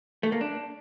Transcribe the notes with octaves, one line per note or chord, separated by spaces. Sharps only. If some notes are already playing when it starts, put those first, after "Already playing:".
A3
A#3
D4